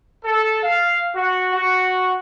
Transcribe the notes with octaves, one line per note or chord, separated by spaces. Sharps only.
A4
F5
F#4
F#4